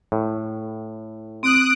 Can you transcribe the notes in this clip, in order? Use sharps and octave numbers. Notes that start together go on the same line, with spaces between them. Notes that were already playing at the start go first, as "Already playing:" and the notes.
A2
C4 D#6 F#6 D7